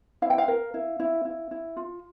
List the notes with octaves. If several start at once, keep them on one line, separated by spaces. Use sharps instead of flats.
E4 F5
G5
F5
A#4
E4
E4
E4
E4
F4